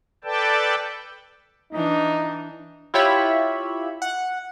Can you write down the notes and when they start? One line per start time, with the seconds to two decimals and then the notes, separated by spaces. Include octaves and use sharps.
0.24 A4 B4 D5 G5 A5
1.72 E3 D4 D#4
2.94 E4 F4 G4 C#5 E5 B5
4.02 F#5